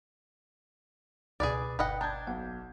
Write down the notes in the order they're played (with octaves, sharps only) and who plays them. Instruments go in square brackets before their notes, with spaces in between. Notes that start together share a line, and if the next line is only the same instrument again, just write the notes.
[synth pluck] C#2 B2 [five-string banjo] G#4 B4 D5
[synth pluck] G1 [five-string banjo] B4 D#5 F#5 [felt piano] G5
[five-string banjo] D4 [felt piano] A5 G6 G#6
[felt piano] B1 [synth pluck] F#5